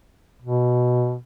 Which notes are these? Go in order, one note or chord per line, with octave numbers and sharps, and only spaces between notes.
B2